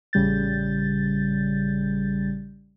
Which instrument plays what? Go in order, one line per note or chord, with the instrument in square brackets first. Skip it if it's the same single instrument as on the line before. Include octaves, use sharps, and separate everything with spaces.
[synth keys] A1 C#3 G3 G6 A6